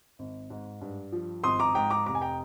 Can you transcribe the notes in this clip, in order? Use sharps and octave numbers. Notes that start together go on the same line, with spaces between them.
G#1
G#2
G2
F3
G#1 C6 D#6
A#5 D6
G#2 G5 A#5
A#5 D6
F1 A#5 D6
G#5
G5 A#5